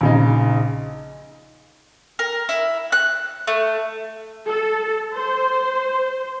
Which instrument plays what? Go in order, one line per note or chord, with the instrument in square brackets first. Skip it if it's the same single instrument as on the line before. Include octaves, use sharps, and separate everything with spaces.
[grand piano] A#1 C#3 D#4
[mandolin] A#4
E4
F#6
A3
[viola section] A4
C5